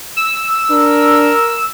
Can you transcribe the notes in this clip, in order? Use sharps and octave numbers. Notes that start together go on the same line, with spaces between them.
E6
D4 A#4